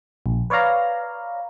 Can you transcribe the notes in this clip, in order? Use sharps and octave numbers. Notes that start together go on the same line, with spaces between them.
A#1
B4 C#5 D5 F5 A#5